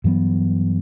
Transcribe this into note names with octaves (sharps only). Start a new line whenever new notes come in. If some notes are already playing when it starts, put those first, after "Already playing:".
G2 E3 F#3 B3